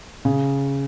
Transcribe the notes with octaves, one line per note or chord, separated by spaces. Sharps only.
C#3